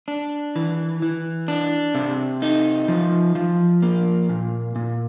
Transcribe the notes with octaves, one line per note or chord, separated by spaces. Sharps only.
D4
E3
E3
D4
C3
D#4
F3
F3
A#3
A#2
A#2